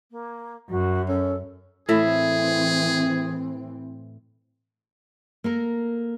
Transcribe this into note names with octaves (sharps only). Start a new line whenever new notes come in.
A#3
F#2 F#4
C#4 A4
A2 E3 C4 E4 G#4 E5
A#3 A4 A#4